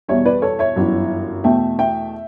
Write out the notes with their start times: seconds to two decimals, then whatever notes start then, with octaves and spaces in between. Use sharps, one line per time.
0.08 E2 B2 G3 C#5 E5
0.25 B4 D5
0.42 A4 C#5
0.59 C#5 E5
0.76 G1 F#2 E3
1.44 E2 B2 A3 E5 G5
1.79 E5 G5